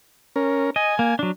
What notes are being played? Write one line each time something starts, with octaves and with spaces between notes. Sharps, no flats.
C#4 A#4
D#5 G#5
A#3
F#3 D4